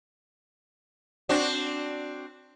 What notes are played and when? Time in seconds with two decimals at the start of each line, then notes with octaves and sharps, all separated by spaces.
1.29 C4 D4 F#4